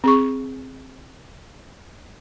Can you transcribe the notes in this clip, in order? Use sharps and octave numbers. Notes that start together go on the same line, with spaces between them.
C4 G#4 C#6